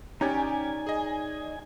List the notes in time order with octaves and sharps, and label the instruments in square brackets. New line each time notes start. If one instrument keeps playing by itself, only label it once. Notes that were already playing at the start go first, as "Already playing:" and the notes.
[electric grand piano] C#4 G4 [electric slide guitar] D#4 C#5 D5 [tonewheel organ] G#5
[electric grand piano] G#4 D#5